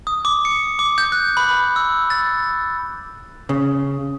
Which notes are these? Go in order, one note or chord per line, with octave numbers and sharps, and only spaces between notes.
D#6
D6
C#7
D6
G6
F#6
B5
E6
A6
C#3